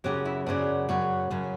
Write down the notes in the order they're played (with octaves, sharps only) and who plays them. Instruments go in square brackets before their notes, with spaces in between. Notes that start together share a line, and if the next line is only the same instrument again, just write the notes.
[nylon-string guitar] F#2 C#3 F#3 [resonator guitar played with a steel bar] G4
[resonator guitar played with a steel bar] E4
[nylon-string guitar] F#2 C#3 F#3 [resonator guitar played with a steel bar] D4
[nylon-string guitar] F#2 C#3 F#3 [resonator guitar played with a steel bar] F#4
[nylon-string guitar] F#2 C#3 F#3